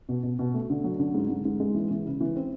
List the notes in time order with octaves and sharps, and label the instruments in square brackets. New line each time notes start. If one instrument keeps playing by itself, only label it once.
[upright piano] B2
B2
B2
A3
D3
F#3
D3
G#2
G#2
G#2
G#3
E3
E3
C#3
E3
C4